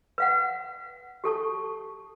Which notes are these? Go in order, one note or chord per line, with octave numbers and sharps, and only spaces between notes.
B4 F5 F#5
G4 A4 A5 C#6